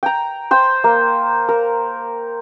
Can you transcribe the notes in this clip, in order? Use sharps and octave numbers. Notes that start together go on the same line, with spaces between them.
G5 A#5
C5 G5
A#3
A#4